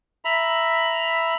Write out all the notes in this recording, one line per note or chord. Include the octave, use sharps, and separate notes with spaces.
E5 A#5 B5